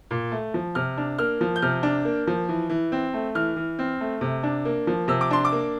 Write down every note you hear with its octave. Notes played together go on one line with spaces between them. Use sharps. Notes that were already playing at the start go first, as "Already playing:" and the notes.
A#2
A3
F3
C3 F6
D4
A#3 F6
F3
G6
C3 F6
D4
A#3
F3
E3
E3
C4
A3
E3 F6
E3
C4
A3
C3
D4
A#3
F3
C3 E6
D6
D4 C6
D6
A#3